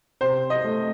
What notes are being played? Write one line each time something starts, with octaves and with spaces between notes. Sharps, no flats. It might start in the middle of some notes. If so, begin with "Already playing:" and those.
C3 C5
D#5
A3